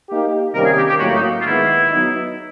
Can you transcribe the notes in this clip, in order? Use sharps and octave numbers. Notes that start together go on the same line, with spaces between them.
A#3 D#4 G4
C3 D#3 G3 A#3 C#4 A#4
G#4
G4
G4
A2 F#3 A#3 F#4
D#4
F4
D#3 G#3 B3 E4
F#3 B3 D#4